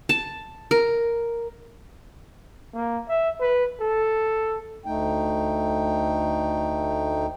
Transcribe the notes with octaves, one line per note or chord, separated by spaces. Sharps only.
A5
A#4
A#3
E5
B4
A4
D2 A3 D#4 G5